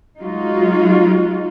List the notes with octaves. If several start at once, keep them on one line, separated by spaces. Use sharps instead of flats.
F#3 G#3 D#4 F4 F#4